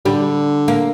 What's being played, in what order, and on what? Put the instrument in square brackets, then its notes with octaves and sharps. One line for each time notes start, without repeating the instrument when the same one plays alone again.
[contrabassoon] D3 [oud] G3
[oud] A#3